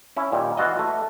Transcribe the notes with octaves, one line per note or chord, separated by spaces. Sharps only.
C#4 E4
A#2 D#3 G3
E3 F4 F#4 D#5
A3